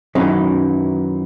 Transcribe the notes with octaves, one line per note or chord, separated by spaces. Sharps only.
F#2 D#3 E3 F#3 C#4 D#4